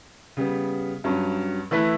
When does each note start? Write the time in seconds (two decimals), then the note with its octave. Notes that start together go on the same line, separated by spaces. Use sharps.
0.37 C#3 G3 B3
1.04 G2 F#3 C#4
1.71 E3 A3 E4 B4